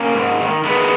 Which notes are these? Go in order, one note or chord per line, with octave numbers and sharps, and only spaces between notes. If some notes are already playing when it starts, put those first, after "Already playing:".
Already playing: A#3 C#4
G#2
D#3
D#3 G#3 B3